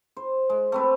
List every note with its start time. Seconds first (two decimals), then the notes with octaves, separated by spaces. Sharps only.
0.17 C5
0.50 G#3
0.72 A3 C4 B4